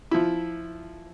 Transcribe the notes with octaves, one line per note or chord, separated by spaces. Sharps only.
F3 E4